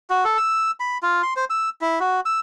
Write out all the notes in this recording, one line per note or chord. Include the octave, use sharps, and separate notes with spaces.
F#4
A4
E6
B5
F4
C6
C5
E6
E4
F#4
E6